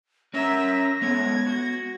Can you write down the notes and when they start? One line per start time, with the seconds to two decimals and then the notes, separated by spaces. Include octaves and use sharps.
0.34 C#4 A#4 E5 A#6
1.02 G#2 A3 B3 C#5 G#6
1.47 F#4